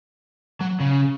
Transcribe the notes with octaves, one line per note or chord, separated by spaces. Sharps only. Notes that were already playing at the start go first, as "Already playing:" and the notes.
F#3
C#3